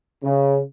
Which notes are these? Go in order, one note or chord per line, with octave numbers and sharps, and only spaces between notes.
C#3